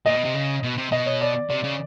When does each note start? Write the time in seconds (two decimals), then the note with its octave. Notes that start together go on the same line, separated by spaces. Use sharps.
0.06 A#2 D#5
0.15 B2
0.24 C3
0.34 C#3
0.63 B2
0.77 C3
0.91 B2 D#5
1.06 C#5
1.21 D5
1.50 C3 D5
1.64 C#3